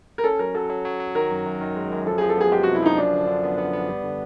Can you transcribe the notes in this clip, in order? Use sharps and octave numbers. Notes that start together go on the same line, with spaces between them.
A#4
C#4 A4
F#3 A#4
F#3 A4
F#3
F#3
F#3
D#3 A#4
F#2
F#2
D#3
G#3
F#2
F3 A4
F3 G#4
A4
B3 G#4
G#3 G4
C3 F#4
E4
F3 D#4
F#2 D4
D3
D3
B3
B3
B3
G3
D3